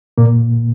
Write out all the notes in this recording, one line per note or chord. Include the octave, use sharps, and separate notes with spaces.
A#2 A#3